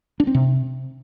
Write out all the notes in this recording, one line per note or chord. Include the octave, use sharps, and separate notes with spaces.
D4
C4
C3